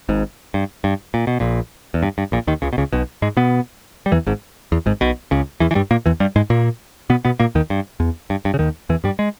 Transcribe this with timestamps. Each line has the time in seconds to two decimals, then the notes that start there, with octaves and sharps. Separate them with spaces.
0.09 G#1 G#2
0.54 G2
0.84 G2
1.14 A#2
1.27 B2
1.40 A#1 A#2
1.94 E2
2.03 G2
2.18 G2
2.32 A#1 A#2
2.47 D#2 D#3
2.62 C#2 C#3
2.73 B2
2.78 C#2 C#3
2.92 B1 B2
3.22 G#2 G#3
3.37 B2 B3
4.06 G3
4.12 E2 E3
4.26 G#1 G#2
4.72 E2
4.86 G#1 G#2
5.01 B1 B2
5.31 C#2 C#3
5.60 E2 E3
5.71 E3
5.75 G2 G3
5.91 A#2 A#3
6.06 E2 E3
6.20 G2 G3
6.36 G#2 G#3
6.50 A#2 A#3
7.10 B2 B3
7.25 B2 B3
7.39 A#2 A#3
7.55 D#2 D#3
7.70 G2
8.00 E2
8.30 G2
8.45 G2
8.54 C#3
8.59 D#2 D#3
8.89 E2 E3
9.04 G2 G3
9.19 G#3